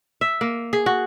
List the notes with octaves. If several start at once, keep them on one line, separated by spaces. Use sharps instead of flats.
E5
A#3
G#4
F#4